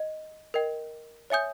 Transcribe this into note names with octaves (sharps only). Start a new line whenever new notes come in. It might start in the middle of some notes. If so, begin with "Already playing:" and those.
Already playing: D#5
A#4 D#5 G5
C#5 E5 G#5 D#6 G6